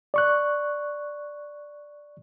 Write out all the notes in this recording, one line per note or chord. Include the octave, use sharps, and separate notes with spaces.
D5 C#6 F#6